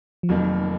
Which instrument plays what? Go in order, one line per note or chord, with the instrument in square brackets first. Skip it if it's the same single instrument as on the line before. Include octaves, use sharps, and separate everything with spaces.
[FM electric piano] F3
[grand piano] F1 F2 D#3 A#3 [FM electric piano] F#3